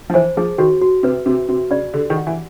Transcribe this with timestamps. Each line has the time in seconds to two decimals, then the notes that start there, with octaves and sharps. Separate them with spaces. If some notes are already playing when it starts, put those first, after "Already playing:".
0.10 F3
0.14 E3 C5
0.37 F3 G#4
0.58 D#3 F#4
0.81 F#4
1.03 C3 B4
1.26 C3 F#4
1.48 C3 F#4
1.70 C#3 D5
1.94 D3 G4
2.10 D#3
2.16 F#5
2.27 E3